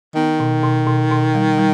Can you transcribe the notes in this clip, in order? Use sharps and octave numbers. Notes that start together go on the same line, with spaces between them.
D#3 B3
B2
B2
B2
B2
G3
G3